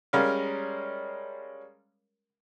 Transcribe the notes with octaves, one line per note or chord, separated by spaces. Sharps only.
G3 G#3 C#4 A#4 F5